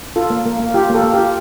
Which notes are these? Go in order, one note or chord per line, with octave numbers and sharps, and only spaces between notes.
F4 A4
A#3
A#3
A#3
F4 G4
A#3 A4
A#3
F4 G4